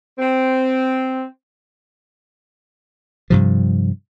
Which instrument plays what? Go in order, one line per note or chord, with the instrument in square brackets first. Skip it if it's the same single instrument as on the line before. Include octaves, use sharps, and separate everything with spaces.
[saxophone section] C4
[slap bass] G2 C3 F3